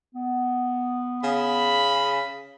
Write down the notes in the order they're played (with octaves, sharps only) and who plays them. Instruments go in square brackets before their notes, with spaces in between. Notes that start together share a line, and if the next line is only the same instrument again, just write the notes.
[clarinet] B3
[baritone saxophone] C#3 [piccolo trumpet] B5